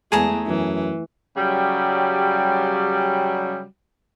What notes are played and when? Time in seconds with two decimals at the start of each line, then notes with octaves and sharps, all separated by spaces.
0.12 E2 G#3 A3 G#4 A5 A#5
0.47 F#2 E3
1.37 C#3 F#3 G3